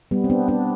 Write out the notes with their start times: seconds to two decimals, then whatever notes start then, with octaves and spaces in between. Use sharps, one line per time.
0.11 G3 B3
0.24 C4
0.30 B3 D4
0.48 B3 D4